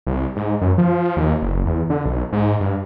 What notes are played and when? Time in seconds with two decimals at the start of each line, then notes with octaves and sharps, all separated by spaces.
0.07 C2
0.36 G#2
0.61 F#2
0.78 F3
1.17 D#2
1.42 F#1
1.66 E2
1.90 D3
2.05 B1
2.33 G#2
2.60 G2